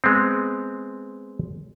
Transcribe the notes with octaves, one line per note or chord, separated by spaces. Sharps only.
G#3 B3 C4